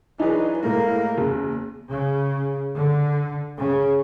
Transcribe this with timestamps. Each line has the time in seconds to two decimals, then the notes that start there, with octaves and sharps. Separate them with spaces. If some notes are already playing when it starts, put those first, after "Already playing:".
0.20 E3 F#3 D4 D#4 G#4 B4
0.63 A2 G#3 A#3 A#4
1.18 F#1 E2
1.89 C#3
2.75 D3
3.57 C#3